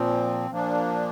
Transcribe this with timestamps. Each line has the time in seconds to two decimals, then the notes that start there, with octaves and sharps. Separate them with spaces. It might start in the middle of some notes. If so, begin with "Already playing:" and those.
Already playing: A#2 F3 C4
0.50 A#2 F3 A#3 D4